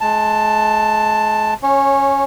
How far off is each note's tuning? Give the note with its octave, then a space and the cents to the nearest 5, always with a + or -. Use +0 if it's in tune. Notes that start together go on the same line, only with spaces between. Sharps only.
G#3 +35 A5 +5
C#4 +0 C#5 -20